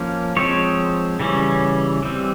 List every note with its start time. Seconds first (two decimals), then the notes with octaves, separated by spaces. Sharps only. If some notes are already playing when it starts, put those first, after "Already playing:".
Already playing: F3 A#3 C#4
0.36 F3 G#3 C4 C#5
1.20 C#3 E3 G3 C#4
2.02 E3 G3 C4